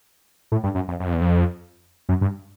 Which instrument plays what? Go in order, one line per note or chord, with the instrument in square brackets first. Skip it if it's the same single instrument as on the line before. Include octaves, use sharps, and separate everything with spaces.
[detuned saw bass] A2
G2
F#2
F2
F#2
F2
E2
F2
F#2
G2